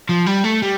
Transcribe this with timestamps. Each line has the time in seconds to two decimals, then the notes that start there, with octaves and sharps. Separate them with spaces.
0.09 F3
0.26 G3
0.44 A3
0.62 G3